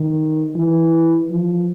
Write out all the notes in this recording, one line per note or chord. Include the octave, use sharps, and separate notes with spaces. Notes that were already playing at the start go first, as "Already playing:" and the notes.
Already playing: D#3
E3
F3